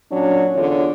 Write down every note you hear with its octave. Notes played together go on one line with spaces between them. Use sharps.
A#2 F#3 C#4 D4
E2 D3 F4 C#5